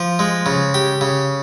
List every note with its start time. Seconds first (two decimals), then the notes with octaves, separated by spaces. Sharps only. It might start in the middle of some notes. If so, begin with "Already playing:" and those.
Already playing: F3
0.19 G#3
0.46 C#3
0.74 G4
1.01 C#3